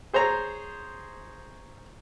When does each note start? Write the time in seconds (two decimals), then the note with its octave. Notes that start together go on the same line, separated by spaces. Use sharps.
0.13 G#4 C5 C#5 A#5